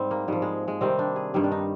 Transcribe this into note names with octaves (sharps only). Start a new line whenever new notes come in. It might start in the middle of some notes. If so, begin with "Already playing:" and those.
Already playing: G#2 G3 C4
A#3
G#2 F3 G3
G#3
G#3
C3 D#3 G3 C4
D4
G#4
G2 D#3 G3
D4
D#4